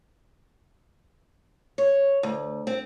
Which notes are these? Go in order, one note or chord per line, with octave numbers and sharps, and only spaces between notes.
C#5
D2
C4